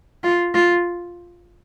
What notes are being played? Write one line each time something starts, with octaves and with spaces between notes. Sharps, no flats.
F4
F4